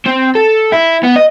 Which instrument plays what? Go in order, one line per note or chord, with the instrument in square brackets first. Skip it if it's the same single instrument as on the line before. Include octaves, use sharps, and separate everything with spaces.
[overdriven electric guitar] C4
A4
E4
B3
D#5